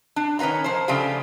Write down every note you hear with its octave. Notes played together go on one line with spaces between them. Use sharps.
D4
D#3 C#4 B4 F5 A#5
F3 C5
C#3 F3 A3 D4 F4 G4